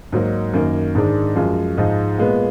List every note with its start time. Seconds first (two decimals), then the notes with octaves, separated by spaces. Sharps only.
0.13 G#2 F#3 A#3 D#4
0.53 F#2 D#3 A#3 D#4
0.95 G#2 D#3 G#3 D4
1.36 F#2 F3 G#3
1.77 G#2 F3 G#3 D#4
2.18 A#2 G#3 B3